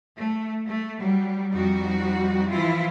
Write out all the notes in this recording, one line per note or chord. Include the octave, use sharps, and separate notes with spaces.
A3
A3
F#3 G3
F2 G3 D#4 F#4
E3 F3 E4 F4